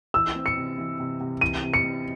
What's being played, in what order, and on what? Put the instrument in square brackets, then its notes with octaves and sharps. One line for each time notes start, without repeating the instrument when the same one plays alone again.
[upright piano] E3 [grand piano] E6
[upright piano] C4
[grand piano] C#7
[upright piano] C3
E3
C3
C3
[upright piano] E3 [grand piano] D#7
[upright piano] C3
[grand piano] C#7
[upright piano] C4